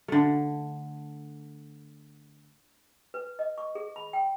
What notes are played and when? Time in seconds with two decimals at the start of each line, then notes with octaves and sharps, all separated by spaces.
0.08 D3 A3
3.14 B4
3.39 D#5
3.58 C#6
3.75 G#4
3.96 B5
4.13 G5